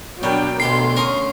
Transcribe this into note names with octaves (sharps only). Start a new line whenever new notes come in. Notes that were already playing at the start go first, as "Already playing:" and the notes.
B2 F#3 G3 D4 A#4 G5
B1 D3 A3 G4 B5 C6 C7
C#4 A#4 D#6